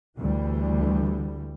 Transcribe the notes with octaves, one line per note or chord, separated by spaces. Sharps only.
D2 E3 G3